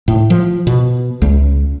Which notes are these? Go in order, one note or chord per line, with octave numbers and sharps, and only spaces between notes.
A2
F3
B2
C#2